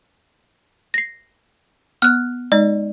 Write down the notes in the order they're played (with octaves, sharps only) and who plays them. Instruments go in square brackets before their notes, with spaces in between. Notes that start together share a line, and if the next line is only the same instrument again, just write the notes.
[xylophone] A#6 C7
[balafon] B3 [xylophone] F6 F#6
[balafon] G#3 D#4 [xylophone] D5